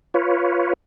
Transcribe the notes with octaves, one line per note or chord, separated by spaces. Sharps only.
F4 B4 C#5